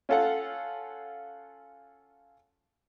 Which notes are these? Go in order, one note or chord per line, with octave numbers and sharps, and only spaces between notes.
C#4 F4 A4 F5 F#5